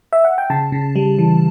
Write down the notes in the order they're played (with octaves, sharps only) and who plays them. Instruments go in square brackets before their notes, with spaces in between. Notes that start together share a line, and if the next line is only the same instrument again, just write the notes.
[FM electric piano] E5
F#5
G5
C#3 A5
C#3
G3
E3